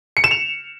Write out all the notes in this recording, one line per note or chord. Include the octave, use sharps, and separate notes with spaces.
C#7
E7
F7